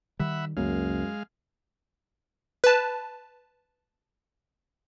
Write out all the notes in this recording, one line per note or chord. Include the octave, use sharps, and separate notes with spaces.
D#3 G3 E5 F#5 B5
C#2 F#2 G#3 A#3 C#4 F5
B4 A5